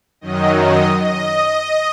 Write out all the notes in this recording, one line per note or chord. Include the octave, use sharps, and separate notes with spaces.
F#2 D#3 F#3 D#5
D#5
D#5